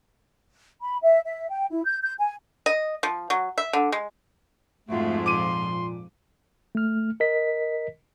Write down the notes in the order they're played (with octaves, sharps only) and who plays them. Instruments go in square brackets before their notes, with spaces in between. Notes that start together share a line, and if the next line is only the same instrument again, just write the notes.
[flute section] B5
E5
E5
G5
E4
G6
G6
G#5
[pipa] D#5
F3
F#3
E5
D3
G#3
[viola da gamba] F2 G#2 F3 [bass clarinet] A3 [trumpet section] F#4
[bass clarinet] A#2 [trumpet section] C6 [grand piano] D6 D#7
[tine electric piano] A3 F6
A#4 D#5 B6